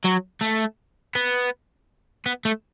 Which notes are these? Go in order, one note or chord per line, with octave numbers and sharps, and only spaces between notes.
F#3
A3
B3
B3
A3